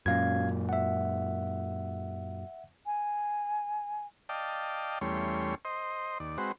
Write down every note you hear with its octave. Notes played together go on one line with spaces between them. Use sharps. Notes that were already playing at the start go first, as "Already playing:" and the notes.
F#2 A#2 C#4 F5 G#6
E5 F#5
G#5
D5 D#5 F5 G5 A5
E2 G3 A3 C#4 C#5 C6
C5 D#5 C6
D#2 D5
G#3 C4 F#4 B4 C5